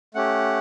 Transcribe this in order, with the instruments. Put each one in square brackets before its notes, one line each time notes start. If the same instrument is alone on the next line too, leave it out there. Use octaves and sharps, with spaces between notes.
[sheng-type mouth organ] A3 C#4 G4 F#5